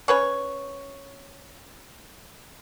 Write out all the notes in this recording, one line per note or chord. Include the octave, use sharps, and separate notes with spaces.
C#4 B4 C#5